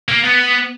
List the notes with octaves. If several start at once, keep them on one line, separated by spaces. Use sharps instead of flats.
A#3
B3